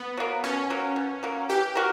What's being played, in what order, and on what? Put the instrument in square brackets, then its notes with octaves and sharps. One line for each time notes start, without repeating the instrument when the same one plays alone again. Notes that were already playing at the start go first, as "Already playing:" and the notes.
Already playing: [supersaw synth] B3
[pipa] F#3 A#3
[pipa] B2 [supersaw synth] C#4
[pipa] F#3 A#3
B2
F#3 A#3
[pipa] E3 [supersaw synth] G4
[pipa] F#4 A#4